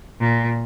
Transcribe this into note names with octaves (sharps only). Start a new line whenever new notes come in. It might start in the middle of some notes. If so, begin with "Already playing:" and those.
A#2